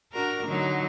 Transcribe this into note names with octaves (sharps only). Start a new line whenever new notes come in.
D4 F#4 A#4
D3 F#3 D#4